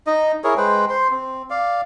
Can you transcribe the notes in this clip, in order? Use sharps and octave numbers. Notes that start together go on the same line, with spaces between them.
D#4 D#5
E4 G#4 A#4 C#5
G#3 B4 C5 G5
C5 C6
C4
D5 F5